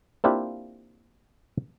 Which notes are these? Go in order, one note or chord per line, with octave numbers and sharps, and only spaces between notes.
A#3 C4 D4 E4 F4 G4